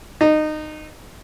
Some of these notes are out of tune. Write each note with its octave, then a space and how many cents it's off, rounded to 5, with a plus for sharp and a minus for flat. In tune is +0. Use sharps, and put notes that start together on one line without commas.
D#4 -20